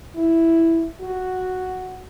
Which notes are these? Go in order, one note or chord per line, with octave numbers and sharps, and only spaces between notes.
E4
F#4